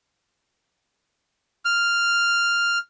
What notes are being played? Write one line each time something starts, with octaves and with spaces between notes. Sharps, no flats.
F6